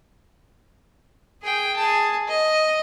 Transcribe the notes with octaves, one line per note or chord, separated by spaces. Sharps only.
G#4 G5
G#4 A5
D#5